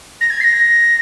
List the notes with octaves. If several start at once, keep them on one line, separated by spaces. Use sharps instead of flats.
A#6
G#6
C7
A#6